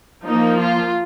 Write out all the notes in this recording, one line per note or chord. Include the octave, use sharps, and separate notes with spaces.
F3 A#3 D#4
F4